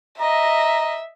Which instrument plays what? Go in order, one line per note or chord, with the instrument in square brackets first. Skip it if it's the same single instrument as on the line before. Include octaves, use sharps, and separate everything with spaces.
[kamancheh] D#5 [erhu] E5 [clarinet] A#5